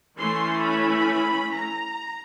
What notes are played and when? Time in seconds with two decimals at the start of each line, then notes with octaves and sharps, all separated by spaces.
0.18 E3 A3 C#4 C6
0.64 B5
1.53 A#5